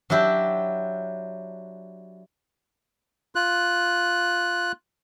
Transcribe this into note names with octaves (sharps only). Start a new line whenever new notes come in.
F#3 D4 E4 G4
F4 F#6